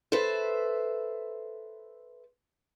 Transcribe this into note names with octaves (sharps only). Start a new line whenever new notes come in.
A4 B4 C5 E5